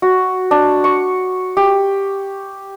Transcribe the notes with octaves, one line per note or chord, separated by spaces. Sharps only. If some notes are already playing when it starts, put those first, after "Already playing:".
F#4
D4
C#6
G4